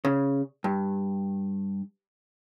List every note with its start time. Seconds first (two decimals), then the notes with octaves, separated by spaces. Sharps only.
0.05 C#3
0.64 G2